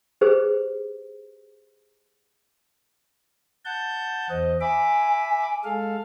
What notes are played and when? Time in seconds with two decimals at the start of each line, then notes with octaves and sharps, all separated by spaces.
0.21 G4 G#4 B4 C5
3.65 F#5 A5 G6
4.30 E2 C5 D#5
4.61 E5 G#5 B5 D6
5.64 G#3 A4 F5